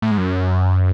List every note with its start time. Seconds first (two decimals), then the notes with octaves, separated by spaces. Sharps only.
0.02 A2
0.11 G#2
0.18 F#2